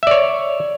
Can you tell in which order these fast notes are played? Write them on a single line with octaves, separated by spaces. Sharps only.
E5 D5 C#5